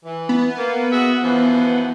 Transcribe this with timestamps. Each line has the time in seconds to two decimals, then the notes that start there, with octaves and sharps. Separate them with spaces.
0.03 E3
0.29 B3
0.58 A#3
0.91 F#4 G#4 E5
1.22 F#2 E3 F3